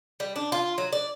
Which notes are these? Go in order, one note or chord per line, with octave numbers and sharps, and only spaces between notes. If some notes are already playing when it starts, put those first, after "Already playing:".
G3
D4
F4
F#3
D5